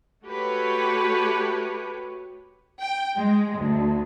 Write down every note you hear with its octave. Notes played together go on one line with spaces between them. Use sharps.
A3 F#4 G4 B4 C#5
G5
G#3
D2